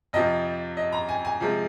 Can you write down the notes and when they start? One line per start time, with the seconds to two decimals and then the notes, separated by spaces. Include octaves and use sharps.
0.13 F2 C3 F3 D#5
0.77 D#5
0.92 A#5
1.09 G#5
1.25 G#5
1.40 C3 F3 G#3